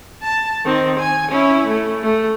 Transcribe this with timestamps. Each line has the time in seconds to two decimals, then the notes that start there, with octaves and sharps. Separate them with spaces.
0.22 A5
0.65 D#3 C4
1.00 G#5
1.31 C#4 E4
1.68 A3
2.03 A3